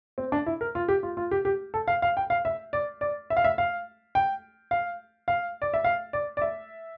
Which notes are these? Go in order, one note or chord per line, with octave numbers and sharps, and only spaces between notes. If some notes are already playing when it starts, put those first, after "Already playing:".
C4
D4
E4
A#4
F4
G4
F4
F4
G4
G4
A4
F5
F5
G5
F5
E5
D5
D5
E5
F5
E5
F5
G5
F5
F5
D5
E5
F5
D5
D5
E5